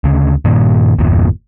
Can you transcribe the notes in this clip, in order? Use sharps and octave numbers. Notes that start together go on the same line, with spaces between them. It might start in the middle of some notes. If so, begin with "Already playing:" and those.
D2 C#3
G2 A#2 D#3 A#3
G1 E2 A#2